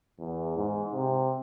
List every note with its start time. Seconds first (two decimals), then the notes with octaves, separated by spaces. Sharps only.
0.19 E2
0.57 G#2
0.94 C3